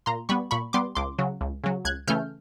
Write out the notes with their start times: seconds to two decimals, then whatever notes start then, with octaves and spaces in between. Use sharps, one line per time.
0.06 A#2 A#5 C6
0.29 G3 B3 B5 C#6
0.51 A#2 B5 C#6
0.73 G3 B3 C6 D6
0.95 C#2 C6 D6
1.18 C#3 F#3
1.41 C#2
1.64 C#3 F#3
1.85 C#2 F#6 G#6
2.07 C#3 E3 A3 C#4 F6 G6